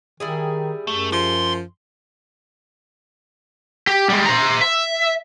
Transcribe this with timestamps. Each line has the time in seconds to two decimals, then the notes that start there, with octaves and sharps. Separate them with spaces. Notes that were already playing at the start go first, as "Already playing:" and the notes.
0.20 D#3 G3 E4 G#4
0.87 F#2 A3
1.12 F3 D4 C6
3.87 G4
4.10 G3 G#3
4.26 C5 A#5
4.61 E5